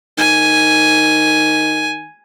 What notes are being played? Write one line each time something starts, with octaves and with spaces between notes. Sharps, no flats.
D#3 G#5